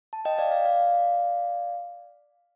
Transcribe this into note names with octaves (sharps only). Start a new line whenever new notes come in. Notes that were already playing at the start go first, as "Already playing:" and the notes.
A5
D#5 G5
D5 F5
D5 F5
D5 F5